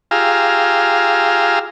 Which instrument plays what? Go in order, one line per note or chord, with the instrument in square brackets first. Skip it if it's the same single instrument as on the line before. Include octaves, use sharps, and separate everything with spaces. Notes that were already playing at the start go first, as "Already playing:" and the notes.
[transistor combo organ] F4 G4 G#4 F5 A#5 E6